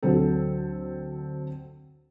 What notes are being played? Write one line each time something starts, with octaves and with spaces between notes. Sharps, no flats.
D2 F#3 C4 A4